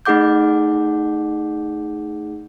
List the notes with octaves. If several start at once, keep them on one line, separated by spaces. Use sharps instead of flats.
A3 D#4 G#4 F#5 D6 G6